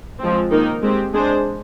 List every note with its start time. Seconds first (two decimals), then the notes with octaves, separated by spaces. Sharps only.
0.20 F3 G#3 C4
0.51 D#3 A#3 D#4 A#4
0.82 G#3 C4 G4
1.14 G#3 D4 G#4 C5